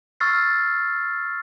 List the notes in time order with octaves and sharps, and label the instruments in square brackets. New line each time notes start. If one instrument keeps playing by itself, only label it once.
[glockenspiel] C#6 E6 F6 A6 C7